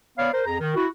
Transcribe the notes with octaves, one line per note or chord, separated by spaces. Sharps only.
B3 C#5 D5 F5
A#4 C5
F2 G#4 A#5
D#3
E4 F#4